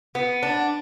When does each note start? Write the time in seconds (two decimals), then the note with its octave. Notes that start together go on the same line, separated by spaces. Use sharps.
0.15 B3
0.43 D4